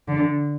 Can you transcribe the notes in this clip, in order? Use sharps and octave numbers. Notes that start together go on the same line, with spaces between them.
D3